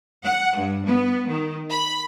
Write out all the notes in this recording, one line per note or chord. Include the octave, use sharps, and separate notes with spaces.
F#5
G2
B3
D#3
B5